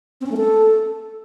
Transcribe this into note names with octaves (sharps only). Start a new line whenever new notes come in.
C4
C#4
A3
A4